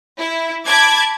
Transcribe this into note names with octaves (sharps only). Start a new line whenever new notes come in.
E4
A5 B5 D6 G#6